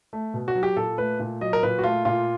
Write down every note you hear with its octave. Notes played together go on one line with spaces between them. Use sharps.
A3
B2
F#4
F#3
G4
A#2 A4
A3 B4
A#2
F#3 D#5
A#4
A#2 B4
F#4
A3 F4
A#2 F4